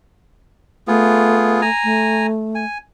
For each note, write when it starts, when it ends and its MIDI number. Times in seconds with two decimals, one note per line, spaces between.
0.88 1.69 57
0.88 1.61 59
0.88 1.61 65
0.88 1.61 68
1.62 2.27 80
1.62 2.27 82
1.84 2.65 57
2.55 2.78 80